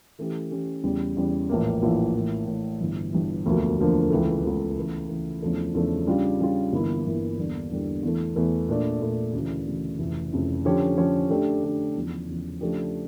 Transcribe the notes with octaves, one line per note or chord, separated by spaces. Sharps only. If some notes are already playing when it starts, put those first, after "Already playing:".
E3 A3 C#4 G4
E3 A3 C#4 G4
E2 C#3 G3
E2 C#3 G3
A#1 A2 E3 A#3
A#1 A2 E3 A#3
A2 E3 A#3
A2 E3 A#3
G1 G2 E3
G1 G2 E3
E1 D2 D3 F3 A#3
E1 D2 D3 F3 A#3
C#2 C#3 E3 A3
C#2 C#3 E3 A3
C#3 E3 A3
C#3 E3 A3
E2 C#3 F3 A3 D4
E2 C#3 F3 A3 D4
C#3 G3 D4 F4
C#3 G3 D4 F4
G1 G2 E3 A#3 E4
G1 G2 E3 A#3 E4
E2 D3 G3 A#3 D4
E2 D3 G3 A#3 D4
E2 E3 A3
E2 E3 A3
A#2 A3 D4
A#2 A3 D4
D2 C#3 E3
D2 C#3 E3
F1 F2 C#3 E3
F1 F2 C#3 E3
D3 F3 C#4 G4 C#5
D3 F3 C#4 G4 C#5
D3 A3 D4 G4
D3 A3 D4 G4
E2 C#3 F3
E2 C#3 F3
C#3 F3 A3 D4 G4